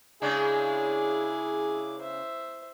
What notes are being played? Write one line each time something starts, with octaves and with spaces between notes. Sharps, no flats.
C#3 G#3 D4 E4 G#4 D6
C5 E5